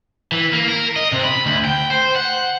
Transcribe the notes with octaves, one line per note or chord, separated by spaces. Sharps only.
E3
A#3
A#4
D#5
C3
B5
D2
G5
C5
F#5